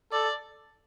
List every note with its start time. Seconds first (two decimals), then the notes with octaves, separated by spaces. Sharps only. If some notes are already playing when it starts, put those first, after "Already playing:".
0.12 A4 D5